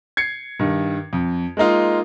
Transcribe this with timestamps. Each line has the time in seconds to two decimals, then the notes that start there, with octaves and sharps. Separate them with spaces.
0.17 G#6 C7 C#7
0.59 G2 D#3
1.13 F2
1.57 G#3 A#3 D#4 F4